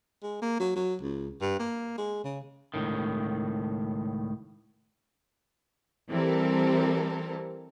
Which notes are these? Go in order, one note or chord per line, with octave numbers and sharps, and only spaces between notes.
G#3
A#3
F#3
F#3
C#2
G2
A#3
G#3
C#3
C#2 A2 D#3
E3 G3 C4 A4 A#4